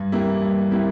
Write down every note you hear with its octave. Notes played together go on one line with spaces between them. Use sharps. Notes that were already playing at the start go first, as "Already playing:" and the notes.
Already playing: G2
E3 A#3 E4 G4
G2
E3 A#3 E4 G4